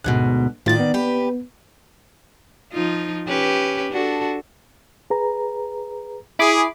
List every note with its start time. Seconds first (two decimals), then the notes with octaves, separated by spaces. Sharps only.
0.04 D2 G#2 B2 F#6
0.66 A2 D#3 F4 D5 A6
0.80 B3
0.94 G4 B4
2.72 F3 D#4 F4
3.27 C#4 G4 B4
3.92 D4 F#4 A4
5.10 G#4 B4 A#5
6.39 E4 G#4 B5 D6